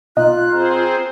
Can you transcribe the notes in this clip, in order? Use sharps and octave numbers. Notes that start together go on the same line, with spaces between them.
B1 D#4 F4 F#6
C4 G#4 C5 A#5